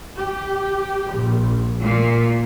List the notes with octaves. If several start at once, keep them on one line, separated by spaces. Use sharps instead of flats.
G4
A#1
A#2